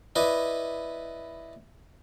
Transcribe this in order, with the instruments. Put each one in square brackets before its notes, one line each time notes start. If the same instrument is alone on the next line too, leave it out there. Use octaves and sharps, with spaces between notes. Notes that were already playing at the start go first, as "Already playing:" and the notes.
[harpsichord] E4 B4 D5 D#5